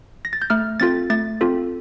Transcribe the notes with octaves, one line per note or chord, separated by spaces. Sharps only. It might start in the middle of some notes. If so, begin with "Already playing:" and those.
A#6
A6
G6
A3 F6
C4 F4 A4 A6
A3 A6
C4 F4 A4